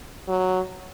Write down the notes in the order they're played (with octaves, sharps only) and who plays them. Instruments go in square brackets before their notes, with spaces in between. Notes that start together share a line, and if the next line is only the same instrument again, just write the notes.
[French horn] F#3